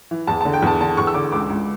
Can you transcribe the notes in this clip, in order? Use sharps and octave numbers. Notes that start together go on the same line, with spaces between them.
E3
E2 A5
A5
D3
G5
E2 A5
D3 A5
E2 C#6
E6
D3 D6
C#2 D6
C#2